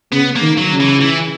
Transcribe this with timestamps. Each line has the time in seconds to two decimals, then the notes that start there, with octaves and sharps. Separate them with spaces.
0.12 C#3 B3
0.36 A#3
0.42 D#3
0.58 F#3
0.72 C#3
0.80 E3
1.02 E3